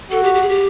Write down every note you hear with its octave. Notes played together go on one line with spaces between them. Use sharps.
F#4 A4
G4
G4
G#4
G4